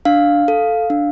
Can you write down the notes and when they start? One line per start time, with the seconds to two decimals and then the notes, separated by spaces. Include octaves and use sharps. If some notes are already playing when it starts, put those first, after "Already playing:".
0.05 D4 F5
0.48 A4
0.90 D4